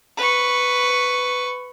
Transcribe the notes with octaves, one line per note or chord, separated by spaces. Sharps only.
B4 C#6